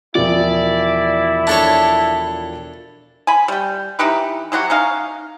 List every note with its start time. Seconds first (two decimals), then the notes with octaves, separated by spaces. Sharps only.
0.15 E1 F3 E4 D5
1.47 D4 A4 C#5
3.27 G#5 B5
3.48 G3 G5
3.99 E3 D#4 G4 B4
4.52 E3 F#3 F#4 G4
4.70 C#4 D#4 F5